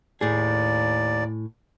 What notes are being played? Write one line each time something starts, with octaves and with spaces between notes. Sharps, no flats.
D#2 A2 G#4 D5